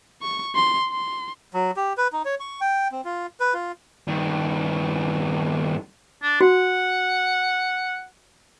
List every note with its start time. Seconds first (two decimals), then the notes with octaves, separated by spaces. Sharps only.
0.22 C#6
0.55 C6
0.90 C6
1.54 F#3
1.77 G4
1.97 B4
2.13 D#4
2.25 C#5
2.40 C#6
2.61 G5
2.92 C4
3.05 F4
3.40 B4
3.54 F4
4.08 G2 D#3
6.22 D4
6.41 F#4 F#5